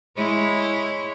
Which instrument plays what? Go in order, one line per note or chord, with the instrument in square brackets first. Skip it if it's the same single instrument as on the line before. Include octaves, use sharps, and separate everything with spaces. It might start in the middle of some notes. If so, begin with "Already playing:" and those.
[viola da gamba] G#3 E4 C#5